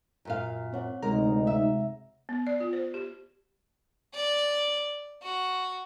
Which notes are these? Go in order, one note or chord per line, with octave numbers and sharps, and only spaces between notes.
F#2 A#2 F5
C4 C#5 F#5
D2 C3 G#3 D#4 A#4 A#5
E5
B3
D5
F4
C5
G4
D5
F#4